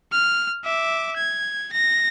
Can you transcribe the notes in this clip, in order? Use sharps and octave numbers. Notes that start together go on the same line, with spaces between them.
F6
E5 D6
G#6
A#6